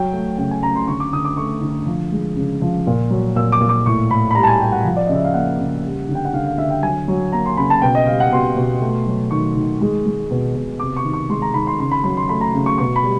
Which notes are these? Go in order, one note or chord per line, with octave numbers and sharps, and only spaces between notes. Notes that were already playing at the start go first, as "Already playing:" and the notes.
Already playing: F#3 G5
A3
C#3 G5
G#5
C#3 A#5
C6
D3 C#6
D6
D3 D#6
D6
A3 C#6
D3
F3
G#3
C#3
F3
A#2
F#3
A#2 E6
D6
A#2
D6
A2 C#6
A2 B5
B5
G3 A#5
A5
G#5
G3 G5
F#5
F3
D5
C#3 D#5
E5
F5
A#3 F#5
C#3
G3
D3
G5
F#5
D3 F5
F5
D3 E5
G5
F#3 G#5
F#3
A#3 A#5
C6
C#3 B5
A5
B2 G5
D#5
G3 F5
F#5
B2 C6
B2
A3
F#3
D#3 C#6
D#3
G#3
G#3
B2
B2
C3 D6
C#6
D#3
C#6
G#3 C6
A#5
D#3 B5
C6
C#3 C6
B5
F#3 B5
C6
A3 B5
A#5
C#3
C#6
B2 C#6
B5
G3